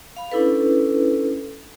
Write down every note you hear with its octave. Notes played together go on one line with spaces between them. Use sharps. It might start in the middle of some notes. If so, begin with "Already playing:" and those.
F5 B5
C#4 D4 E4 A4 B4